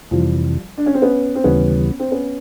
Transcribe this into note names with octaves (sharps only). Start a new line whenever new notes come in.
F2 C3 E3 F3 G3
D4
C#4
C4
B3 C#4
C4
D#2 C#3 E3 G3 B3 C#4
C4
B3 C#4